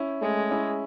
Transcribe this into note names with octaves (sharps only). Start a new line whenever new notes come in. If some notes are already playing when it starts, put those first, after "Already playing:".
Already playing: C#4 E4
G#3 A3 C#4
C#4 E4